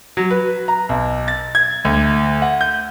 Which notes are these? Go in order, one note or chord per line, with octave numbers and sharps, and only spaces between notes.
F#3
B4
A#5
B1
A6
G#6
D2
F#5
G6